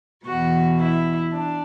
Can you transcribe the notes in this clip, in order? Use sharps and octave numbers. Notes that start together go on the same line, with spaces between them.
E2 B2 F#4
E4
D4